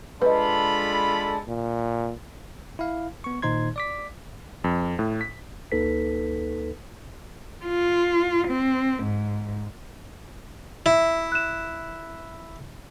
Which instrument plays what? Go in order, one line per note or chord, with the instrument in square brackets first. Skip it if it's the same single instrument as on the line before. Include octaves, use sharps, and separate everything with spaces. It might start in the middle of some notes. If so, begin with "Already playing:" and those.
[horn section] G#3 D4 A4 [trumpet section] F4 B5 [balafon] B4 D#5
[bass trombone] A#2
[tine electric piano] E4 F5
B3 C#6
A#2 D#3 D#4 C5 C6 G#6
D5 D6 B6
[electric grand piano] F2
A2
B6
[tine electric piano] D2 A#3 D#4 A4 B4 B6
[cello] F4
C4
G#2
[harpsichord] E4 [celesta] E5
[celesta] F#6 E7